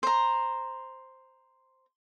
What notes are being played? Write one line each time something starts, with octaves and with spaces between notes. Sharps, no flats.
C5 A#5